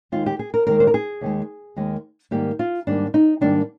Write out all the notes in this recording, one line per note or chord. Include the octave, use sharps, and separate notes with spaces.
D#2 D#3 G#3 F4
G4
G#4
A#4
D#2 D#3 G#3 A#4
C5
A#4
G#4
D#2 D#3 G#3
D#2 D#3 G#3
G#2 D#3 G3 A#3 G4
F4
G#2 D#3 G3 A#3 D4
D#4
G#2 D#3 G3 A#3 D4